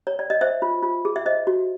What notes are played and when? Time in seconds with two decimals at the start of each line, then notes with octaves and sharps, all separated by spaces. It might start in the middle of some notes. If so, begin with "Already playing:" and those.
0.07 C#5
0.19 D5
0.30 D#5
0.41 C5 E5
0.62 F4
0.83 F4
1.05 G#4
1.16 E5
1.26 C5 D#5
1.47 F#4